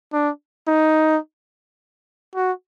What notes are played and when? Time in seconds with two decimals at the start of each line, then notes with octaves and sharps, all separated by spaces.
0.13 D4
0.68 D#4
2.35 F#4